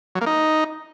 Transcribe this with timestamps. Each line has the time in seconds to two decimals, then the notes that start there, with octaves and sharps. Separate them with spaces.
0.15 F#3
0.21 A#3
0.27 D#4